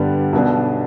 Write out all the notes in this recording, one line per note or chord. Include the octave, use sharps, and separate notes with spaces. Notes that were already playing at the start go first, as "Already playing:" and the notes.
Already playing: G2 D3 G3 B3 D4
B1 B2 B3 D4